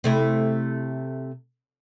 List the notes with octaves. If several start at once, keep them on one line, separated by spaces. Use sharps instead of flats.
C3 A3 E4